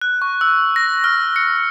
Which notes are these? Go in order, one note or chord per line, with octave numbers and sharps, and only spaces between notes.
F#6
C#6
E6
A#6
F6
C#7